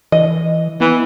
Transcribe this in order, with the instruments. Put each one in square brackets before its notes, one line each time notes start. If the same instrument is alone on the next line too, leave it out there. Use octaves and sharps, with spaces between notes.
[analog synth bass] E3 [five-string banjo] D#5
[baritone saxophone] E3 [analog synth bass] B3